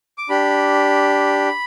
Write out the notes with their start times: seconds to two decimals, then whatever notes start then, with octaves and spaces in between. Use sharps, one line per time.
0.18 D6
0.29 D4 G4 B5